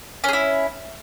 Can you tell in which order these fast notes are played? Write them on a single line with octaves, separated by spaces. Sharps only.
C#4 G#4 E4